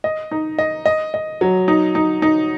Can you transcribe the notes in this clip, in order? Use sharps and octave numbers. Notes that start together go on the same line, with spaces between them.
D#5
D#4
D#5
D#5
D#5
F#3
D#4
D#4
D#4